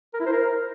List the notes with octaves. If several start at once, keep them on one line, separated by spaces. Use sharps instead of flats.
A#4
E4
C5
A#4